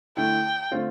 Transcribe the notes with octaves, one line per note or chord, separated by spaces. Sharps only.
D3 A3 E4 G5
D3 A3 C4 F4